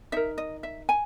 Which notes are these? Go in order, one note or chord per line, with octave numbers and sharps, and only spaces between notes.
D#4 A#4 E5
D#5
E5
G#5